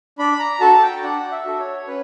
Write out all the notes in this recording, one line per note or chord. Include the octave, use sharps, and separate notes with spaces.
D4 B5
A#5
F#4 A4 A5
G5
D4 F#5
E5
F#4 A4
C#5
C#4 B4